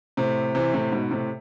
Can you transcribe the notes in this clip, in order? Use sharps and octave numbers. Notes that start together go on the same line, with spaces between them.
A2 C3
C3 E3
A2 C3
G#2 B2
A2 C3